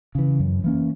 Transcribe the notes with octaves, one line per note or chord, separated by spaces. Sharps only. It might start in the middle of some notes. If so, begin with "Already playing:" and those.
C#3 E3
F#2
E3 A#3 C#4